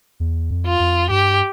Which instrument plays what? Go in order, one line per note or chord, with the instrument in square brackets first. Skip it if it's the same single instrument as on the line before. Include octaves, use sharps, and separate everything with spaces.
[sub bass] E2
F2
[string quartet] F4
[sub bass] F2
[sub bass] G2 [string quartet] G4